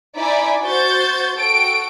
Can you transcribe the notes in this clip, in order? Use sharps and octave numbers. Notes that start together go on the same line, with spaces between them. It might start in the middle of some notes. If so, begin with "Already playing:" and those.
D#4 E4 D5 E5 G#5 B5
F#4 C5 G6 A6
F#4 A4 G5 D7